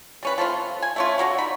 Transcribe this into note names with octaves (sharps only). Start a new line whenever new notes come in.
G3 C#4 B4
F3 A3 C4 F4
G#5
A3 C#4 F4
D3 F#4 A#4 C#5
D#4 B5